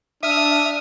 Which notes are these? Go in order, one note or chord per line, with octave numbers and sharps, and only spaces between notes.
D4 E5 D#6 F6